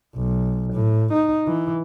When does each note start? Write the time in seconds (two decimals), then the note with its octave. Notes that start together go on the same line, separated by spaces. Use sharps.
0.16 B1
0.73 A2
1.13 D#4
1.47 E3